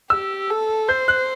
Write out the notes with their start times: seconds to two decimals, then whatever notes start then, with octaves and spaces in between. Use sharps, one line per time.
0.10 G4 E6
0.50 A4
0.88 C5 G6
1.08 F#6